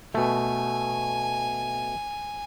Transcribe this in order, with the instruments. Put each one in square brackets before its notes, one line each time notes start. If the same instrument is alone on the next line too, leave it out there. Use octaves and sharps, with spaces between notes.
[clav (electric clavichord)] B2 A3 [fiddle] G#5